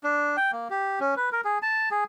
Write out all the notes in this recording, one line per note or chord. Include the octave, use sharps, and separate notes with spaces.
D4
G5
A#3
G4
C#4
B4
A#4
G#4
A5
G#4